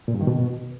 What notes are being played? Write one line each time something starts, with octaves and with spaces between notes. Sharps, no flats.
A#2
G2
D#3
B2